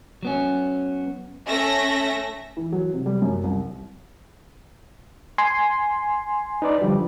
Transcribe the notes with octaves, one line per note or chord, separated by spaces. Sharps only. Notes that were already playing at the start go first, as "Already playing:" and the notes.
F#3 B3 C#4
A3 C#4 E5 A#6
E3
F#3
C3
G3
F#2
C2
G#5 C6
D#4 B4 D5
D3 F3 G3